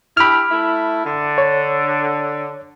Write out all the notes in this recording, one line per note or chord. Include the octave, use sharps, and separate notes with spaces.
D4 E4 G4 B5 F6
A3 E4
D3
C#5